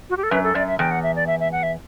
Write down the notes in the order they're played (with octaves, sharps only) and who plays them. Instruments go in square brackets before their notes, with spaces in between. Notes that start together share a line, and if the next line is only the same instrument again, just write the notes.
[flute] F#4
G4
A4
[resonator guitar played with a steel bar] F#2 [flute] B4
[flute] A4
[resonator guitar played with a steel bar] F#2 [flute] D5
[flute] E5
[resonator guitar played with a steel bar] E2 [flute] G5
[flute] F#5
E5
D5
E5
E5
F#5
E5